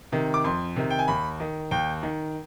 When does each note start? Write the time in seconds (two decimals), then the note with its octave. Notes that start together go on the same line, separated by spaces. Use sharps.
0.12 C3 D#3
0.34 D6
0.44 F2 C6
0.76 C3 D#3
0.90 G5
0.99 G#5
1.08 D#2 B5
1.40 D#3
1.71 D#2 G5
2.03 D#3